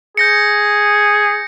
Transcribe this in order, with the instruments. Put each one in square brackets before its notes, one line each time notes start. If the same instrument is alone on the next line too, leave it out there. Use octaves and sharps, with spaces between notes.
[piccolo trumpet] G#4 [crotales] G6 A#6 C#7